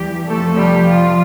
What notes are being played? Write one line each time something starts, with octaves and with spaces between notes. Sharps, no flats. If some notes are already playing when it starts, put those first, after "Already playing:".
Already playing: E2 E3 G3 G4
F2 C3 F3 A3 A4
G3 G4
F3 F4